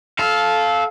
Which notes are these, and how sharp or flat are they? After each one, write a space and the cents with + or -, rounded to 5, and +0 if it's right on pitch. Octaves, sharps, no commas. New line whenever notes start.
A4 -20 F5 +0